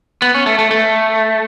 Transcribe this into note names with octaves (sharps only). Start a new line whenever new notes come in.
B3
C#4
A3
A3
A3